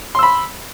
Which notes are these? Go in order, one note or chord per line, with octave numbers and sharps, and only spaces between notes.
B5 C6 E6